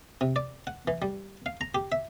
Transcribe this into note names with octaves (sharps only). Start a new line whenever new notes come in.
C3
D5
F#5
E3
G3
F5
A#5
G4
E5